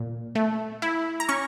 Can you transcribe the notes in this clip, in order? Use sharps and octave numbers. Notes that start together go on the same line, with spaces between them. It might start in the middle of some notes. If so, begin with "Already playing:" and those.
Already playing: A#2
A3
E4
A#5
C#4 C#6